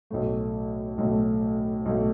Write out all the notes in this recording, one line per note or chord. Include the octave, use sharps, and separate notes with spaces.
B1 A2 A3
B1 A2 A3
B1 A2 A3